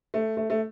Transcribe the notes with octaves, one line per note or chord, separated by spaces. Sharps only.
A3
A3
A3